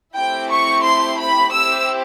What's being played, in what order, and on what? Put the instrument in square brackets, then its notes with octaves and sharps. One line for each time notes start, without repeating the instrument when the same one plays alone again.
[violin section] A3 C4 E4 G4 G5
C#6
C6
B5
C4 E4 G4 E6